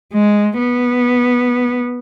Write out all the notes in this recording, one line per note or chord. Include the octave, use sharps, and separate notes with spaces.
G#3
B3